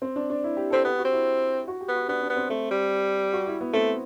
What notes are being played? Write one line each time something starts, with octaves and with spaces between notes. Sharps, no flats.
C4
D4
D4
E4
G4
C4 A4
B3 G4
F#4
C4
E4
F#4
G4
B3
F#4
B3 D4
D4
B3
C4
A3 C4
G3
F#4
E4
B3
A3 C4